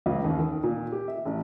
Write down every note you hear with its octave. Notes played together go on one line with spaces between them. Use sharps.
C#2
D#2
D#3
A#2
G4
E5
A1